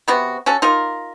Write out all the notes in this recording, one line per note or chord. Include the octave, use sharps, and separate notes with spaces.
C3 B3 F#4
C#4 F#4 A4
D#4 F4 A#4